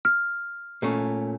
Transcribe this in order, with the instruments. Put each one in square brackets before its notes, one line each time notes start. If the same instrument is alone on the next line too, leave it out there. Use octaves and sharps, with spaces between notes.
[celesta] F6
[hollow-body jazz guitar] A#2 A3 C#4